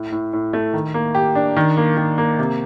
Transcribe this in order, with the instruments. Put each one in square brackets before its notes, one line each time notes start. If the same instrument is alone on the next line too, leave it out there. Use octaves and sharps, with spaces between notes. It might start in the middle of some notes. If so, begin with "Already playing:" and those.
Already playing: [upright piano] A2
A2
A2
A3
D#3
A#3
G4
D4
D#3
A#3
D#3
A#3
C3